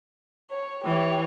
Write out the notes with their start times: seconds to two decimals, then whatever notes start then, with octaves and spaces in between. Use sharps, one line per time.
0.51 C#5
0.85 E3 G4 C#5